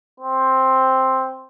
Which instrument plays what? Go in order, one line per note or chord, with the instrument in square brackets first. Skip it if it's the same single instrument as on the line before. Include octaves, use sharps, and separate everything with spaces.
[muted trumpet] C4